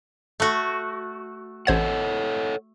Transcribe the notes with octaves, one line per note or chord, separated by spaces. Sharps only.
A3 F#4
A1 A4 C5 C#5 F#5 G#6